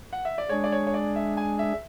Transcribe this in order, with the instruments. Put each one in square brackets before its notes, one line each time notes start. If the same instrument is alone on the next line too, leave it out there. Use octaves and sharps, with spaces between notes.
[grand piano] F#5
E5
D5
[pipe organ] G#3 D4 G#4 [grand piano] C#5
[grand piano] D5
C#5
C#5
D5
E5
G#5
E5